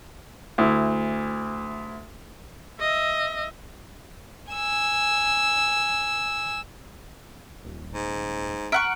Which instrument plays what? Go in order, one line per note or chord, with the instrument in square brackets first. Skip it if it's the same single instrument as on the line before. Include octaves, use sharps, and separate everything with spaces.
[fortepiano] D2 E4
[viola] D#5 E5
[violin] G#5 E6
[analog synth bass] D#1
[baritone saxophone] G#2
[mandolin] E5 F#5 C#6 [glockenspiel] A#5 F6 D7